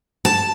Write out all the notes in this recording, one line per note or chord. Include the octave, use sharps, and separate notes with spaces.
A5